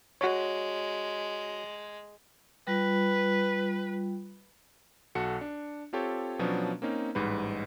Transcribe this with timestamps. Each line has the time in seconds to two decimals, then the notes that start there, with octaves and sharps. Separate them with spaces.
0.21 G#3 F#4 C#5
2.67 G3 F4 B4
5.15 B1 F#4 A4 C#7
5.41 D4
5.93 C4 F4 G4 A4 C#5
6.39 B2 F3 F#3 B3 C#4 D4
6.82 A#3 C4 C#4 D#4
7.15 A1 G#2 G3 B4